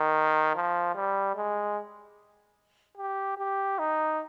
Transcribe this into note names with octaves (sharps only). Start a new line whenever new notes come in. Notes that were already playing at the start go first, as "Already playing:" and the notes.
Already playing: D#3
F3
G3
G#3
G4
G4
D#4